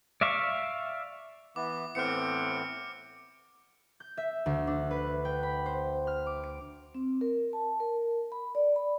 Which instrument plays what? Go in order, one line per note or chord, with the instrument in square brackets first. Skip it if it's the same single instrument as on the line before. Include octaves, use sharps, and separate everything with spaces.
[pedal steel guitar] D5 E5 F5 C#6 D6
[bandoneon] E3 B3 [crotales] D6
[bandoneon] A2 E3 B3 [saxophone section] C4 [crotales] F6 C#7
[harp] G6
E5
D2
D4
B4
G5
B5
C5
F6
D6
D7
[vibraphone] C4
A#4
A5
A#4
B5
D5
B5